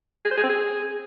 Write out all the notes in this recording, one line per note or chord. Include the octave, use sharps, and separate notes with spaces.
G#4
C5
G#4
C4
G#4